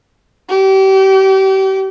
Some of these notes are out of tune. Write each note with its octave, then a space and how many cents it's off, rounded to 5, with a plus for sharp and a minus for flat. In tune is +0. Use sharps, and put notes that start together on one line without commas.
G4 -35